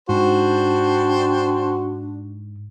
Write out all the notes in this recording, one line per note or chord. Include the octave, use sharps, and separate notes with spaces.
G#2 D4 F#4 C5 G5 A5